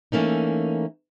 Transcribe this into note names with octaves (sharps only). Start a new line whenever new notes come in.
E3 A3 A#3 C#4 D#4